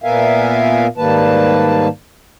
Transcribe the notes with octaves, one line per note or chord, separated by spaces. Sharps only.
A#2 B3 A#4 E5 F5 G#5
G#2 D#3 G3 A#3 B4 A5